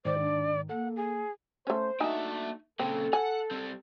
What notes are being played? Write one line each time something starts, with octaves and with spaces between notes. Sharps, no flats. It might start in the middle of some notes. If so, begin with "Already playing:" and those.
G#2 D#3 C5 D5
D4
A#3 A4 F#5
G#4
A3 C#4 C5
A3 A#3 D4 D#4 F#4 E5 G#5
A#2 C#3 C4 A4
F#5 G#5
G3 C4